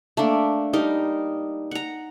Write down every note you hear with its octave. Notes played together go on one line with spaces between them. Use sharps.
A3 A#3 D4
G3 D#4 A#4
F#5 A#5